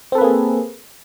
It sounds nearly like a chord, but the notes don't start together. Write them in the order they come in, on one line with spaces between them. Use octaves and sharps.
C4 A4 B4 A#3 G#4